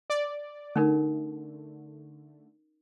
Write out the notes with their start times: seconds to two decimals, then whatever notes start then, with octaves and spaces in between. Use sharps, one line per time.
0.10 D5
0.76 D3 A3 C#4 D#4 A#4